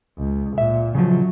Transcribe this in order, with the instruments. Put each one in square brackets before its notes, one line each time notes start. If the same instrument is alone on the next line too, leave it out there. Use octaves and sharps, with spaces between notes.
[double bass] C#2
[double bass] A#2 [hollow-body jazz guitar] E5
[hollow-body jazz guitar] C#3 F3 [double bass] F#3